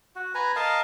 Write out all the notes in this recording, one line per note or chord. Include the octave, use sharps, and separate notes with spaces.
F#4
B4 G#5 A#5
A#4 D#5 F5 A5